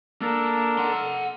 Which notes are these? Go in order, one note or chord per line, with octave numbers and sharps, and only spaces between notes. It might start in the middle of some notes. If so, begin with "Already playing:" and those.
A#3 D4 A4 A#4
F#5 C6